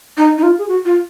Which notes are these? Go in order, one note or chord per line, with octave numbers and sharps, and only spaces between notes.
D#4
D#4
F4
G#4
F#4
F4